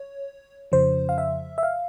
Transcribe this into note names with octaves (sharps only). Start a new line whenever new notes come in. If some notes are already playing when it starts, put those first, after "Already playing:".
Already playing: C#5
F2 C#3 F3 C5
F5
E5
E5
F5